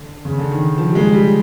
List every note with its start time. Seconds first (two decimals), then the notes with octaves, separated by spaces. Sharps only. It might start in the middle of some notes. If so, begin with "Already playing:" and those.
Already playing: D3
0.25 C#3
0.38 D3
0.51 D#3
0.78 F3
0.91 G3
0.95 G#3
1.13 G3